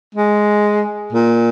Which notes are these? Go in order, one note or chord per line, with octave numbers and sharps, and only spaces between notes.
G#3
A#2